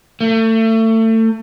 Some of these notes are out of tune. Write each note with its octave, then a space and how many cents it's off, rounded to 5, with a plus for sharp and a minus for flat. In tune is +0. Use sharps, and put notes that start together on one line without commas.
A3 +30